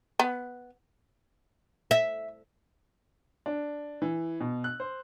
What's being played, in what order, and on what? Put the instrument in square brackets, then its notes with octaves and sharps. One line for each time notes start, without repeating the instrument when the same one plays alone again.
[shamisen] B3
[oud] E5
[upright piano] D4
E3
B2
F#6
C5